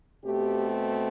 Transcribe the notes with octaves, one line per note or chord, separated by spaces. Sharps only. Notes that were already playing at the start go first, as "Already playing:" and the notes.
B2 A3 C4 G4